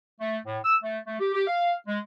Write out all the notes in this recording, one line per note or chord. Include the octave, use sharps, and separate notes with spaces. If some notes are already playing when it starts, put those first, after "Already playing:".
A3
A2
E6
A3
A3
G4
G4
F5
G#3